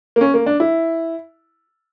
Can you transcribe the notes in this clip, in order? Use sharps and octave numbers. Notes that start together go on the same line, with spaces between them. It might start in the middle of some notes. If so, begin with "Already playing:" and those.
A#3
C#4
A#3
D4
E4